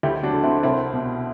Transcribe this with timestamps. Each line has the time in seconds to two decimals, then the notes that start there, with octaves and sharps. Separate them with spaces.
0.03 D2 E4 G4
0.23 D4 F#4
0.33 D3
0.43 C4 E4
0.63 C2 C4 E4
0.93 B2